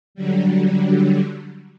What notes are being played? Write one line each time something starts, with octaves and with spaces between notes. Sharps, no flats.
D3 F#3 G3